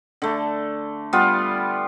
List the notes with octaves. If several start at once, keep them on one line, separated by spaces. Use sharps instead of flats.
D3 A3
G3 B3 F4